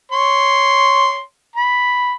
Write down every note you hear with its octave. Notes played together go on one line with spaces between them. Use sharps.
C#5 C6
B5